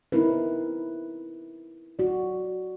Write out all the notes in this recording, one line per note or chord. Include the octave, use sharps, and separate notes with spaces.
C4 D#4 E4 A#4 B4
F#4 D5